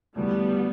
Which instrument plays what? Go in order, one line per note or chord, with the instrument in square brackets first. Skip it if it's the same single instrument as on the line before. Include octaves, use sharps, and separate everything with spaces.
[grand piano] E2 D3 A3 D4 F#4 [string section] G3 B3